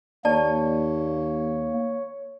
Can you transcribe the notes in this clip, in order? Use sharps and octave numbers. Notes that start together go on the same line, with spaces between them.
D#2 A#3 C#5 D5 A5